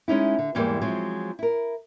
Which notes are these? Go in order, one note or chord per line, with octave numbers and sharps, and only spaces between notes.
G#3 C#4 D#4 E4
D3
E2 G#2 E3 G3 G#3 A#3
F3 F#3 G#3 C4
E4 A#4